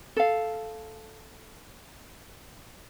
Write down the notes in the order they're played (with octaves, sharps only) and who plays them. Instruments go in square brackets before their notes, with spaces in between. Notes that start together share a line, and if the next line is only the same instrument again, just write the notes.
[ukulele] A4 F5